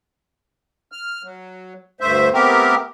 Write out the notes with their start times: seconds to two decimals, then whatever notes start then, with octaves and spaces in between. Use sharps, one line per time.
0.92 F6
1.23 F#3
2.00 D2 G2 A3 C5 E5
2.33 A3 B3 C4 G4 A#4